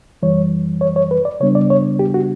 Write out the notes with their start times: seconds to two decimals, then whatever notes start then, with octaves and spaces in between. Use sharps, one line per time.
0.22 F#2 E3 G3 C#5
0.81 C#5
0.96 C#5
1.11 B4
1.25 D5
1.40 C#3 G3 B3 D4 C#5
1.55 D5
1.70 C#5
1.99 G4
2.14 F#4